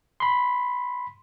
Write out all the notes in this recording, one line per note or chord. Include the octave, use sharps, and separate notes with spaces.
B5 C6